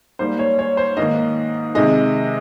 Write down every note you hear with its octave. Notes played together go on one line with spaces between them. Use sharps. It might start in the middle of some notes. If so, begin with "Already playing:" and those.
G#2 G3 A#3 C5
C#5
C#5
C5
G#2 D#3 A#3 D#5
C3 D#3 G#3 D#5